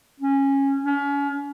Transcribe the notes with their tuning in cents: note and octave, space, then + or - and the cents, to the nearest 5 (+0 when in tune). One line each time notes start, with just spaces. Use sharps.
C#4 -15
C#4 +35